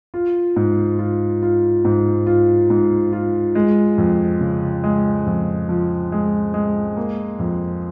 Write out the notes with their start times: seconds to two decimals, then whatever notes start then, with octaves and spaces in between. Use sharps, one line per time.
0.14 F4
0.56 G#2
0.99 F4
1.42 F4
1.85 G#2
2.27 F4
2.70 G#2
3.13 F4
3.55 G#3
3.98 F2
4.41 C#3
4.84 G#3
5.26 F2
5.69 F3
6.12 G#3
6.54 G#3
6.97 A#3
7.39 F2